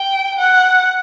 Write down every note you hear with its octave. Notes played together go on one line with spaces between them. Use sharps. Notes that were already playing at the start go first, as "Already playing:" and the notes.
Already playing: G5
F#5